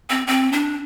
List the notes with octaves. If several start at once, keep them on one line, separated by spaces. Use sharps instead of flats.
C4
C4
D4